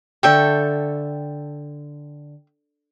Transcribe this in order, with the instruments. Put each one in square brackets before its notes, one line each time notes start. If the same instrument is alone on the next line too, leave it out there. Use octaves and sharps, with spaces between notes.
[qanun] D3 A4 C#6 [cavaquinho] E5 G5